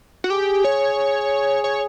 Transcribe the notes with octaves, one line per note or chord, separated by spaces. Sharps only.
F#4
G4 G#4
C#5
C#5